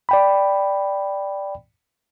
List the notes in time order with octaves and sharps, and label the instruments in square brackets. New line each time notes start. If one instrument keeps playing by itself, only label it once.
[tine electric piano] D5 G5 B5